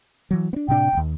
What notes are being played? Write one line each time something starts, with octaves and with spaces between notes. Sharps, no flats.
E3 F#3
B3 D4
A2 C3 D4 G5
D#1 D#2